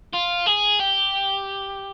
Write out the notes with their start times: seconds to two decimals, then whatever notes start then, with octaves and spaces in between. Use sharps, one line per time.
0.14 F4
0.47 G#4
0.80 G4